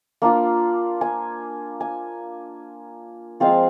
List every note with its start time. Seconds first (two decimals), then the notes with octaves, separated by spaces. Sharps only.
0.22 A#3 D4 F4
1.01 G#5
1.81 G#5
3.40 F3 G#3 C4 F4 F5